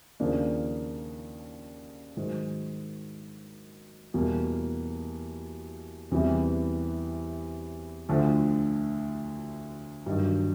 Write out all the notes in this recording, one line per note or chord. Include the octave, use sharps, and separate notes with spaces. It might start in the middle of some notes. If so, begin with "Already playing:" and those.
D#2 C#3 F3 A#3 D4
G#2 D#3 F#3
E2 B2 G3 A#3
E2 C3 E3 G3
D2 D3 F3 A3
G2 D#3 F#3